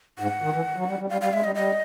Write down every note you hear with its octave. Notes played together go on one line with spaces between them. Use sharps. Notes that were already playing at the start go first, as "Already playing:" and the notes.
G#2 F#5
D#3
E3
F#3
G3
G3
G3 F5
G3 F5
G#3 E5
G3 D#5
G3 D#5